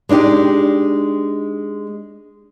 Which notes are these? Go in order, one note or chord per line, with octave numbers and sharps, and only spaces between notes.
G#3 D4 D#4 G4